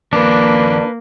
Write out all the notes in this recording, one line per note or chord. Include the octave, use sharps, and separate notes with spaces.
D#2 F3 A#3 D4 B4